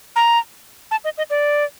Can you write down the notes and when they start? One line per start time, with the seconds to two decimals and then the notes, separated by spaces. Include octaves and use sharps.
0.16 A#5
0.91 A5
1.04 D#5
1.18 D#5
1.30 D5